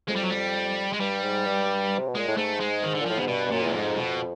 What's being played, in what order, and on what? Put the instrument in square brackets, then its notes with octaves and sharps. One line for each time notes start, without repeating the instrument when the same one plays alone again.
[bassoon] F2 [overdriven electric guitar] G#3
[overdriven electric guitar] G3
F#3
G3
G#3
[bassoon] G2 [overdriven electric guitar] G3
[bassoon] G#2
G2
C3
B2
[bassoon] A#2 [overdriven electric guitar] G#3
[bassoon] A2
[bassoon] G#2 [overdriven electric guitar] A3
[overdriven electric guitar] G#3
D#3
D3
[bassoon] A#2
[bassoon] A2 [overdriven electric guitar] F3
[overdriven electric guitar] B2
[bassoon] G#2
[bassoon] G2 [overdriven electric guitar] B2
[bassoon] G2
[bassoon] F#2 [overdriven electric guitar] A#2
[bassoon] E2 [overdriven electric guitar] A2
[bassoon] F2 [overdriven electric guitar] G#2
[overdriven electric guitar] B2